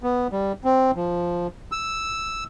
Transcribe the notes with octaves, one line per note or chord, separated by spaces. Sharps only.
B3
G3
C4
F3
E6